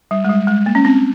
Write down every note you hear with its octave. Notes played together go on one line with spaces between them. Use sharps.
G3
G#3
G3
G#3
A#3
C#4
C4